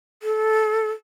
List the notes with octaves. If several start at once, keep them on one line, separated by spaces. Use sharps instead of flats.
A4